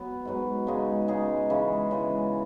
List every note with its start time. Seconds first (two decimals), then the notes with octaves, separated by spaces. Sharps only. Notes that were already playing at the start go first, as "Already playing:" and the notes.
Already playing: F#3 B3
0.25 G#2 F#3 B3
0.67 C#3 G#3 D#4 G#4
1.08 C#3 G#3 D#4 G#4
1.50 C#3 E3 G#3
1.91 C#3 E3 G#3